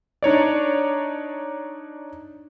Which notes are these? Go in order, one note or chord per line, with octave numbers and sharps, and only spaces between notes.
D4 D#4 C#5 D5